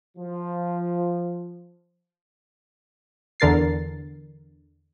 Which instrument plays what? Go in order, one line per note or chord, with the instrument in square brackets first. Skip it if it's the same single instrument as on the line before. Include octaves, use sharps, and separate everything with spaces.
[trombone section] F3
[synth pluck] E2 D3 A#4 A6 C7